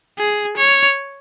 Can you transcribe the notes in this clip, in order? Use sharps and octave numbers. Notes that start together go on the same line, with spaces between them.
G#4
C#5